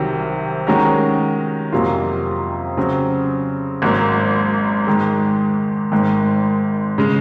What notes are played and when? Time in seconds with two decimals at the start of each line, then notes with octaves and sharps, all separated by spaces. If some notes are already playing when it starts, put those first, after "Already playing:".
Already playing: C2 C3 D#3 F#3
0.67 D#3 G#3 C#4 F#4 A#4
1.72 F2 C3 F#3 A#3 F4
2.77 C#3 F#3 C4
3.82 G#1 G#2 F#3 A#3
4.87 G#2 D#3 G#3
5.92 G#1 G#2 D#3
6.98 C#3 G#3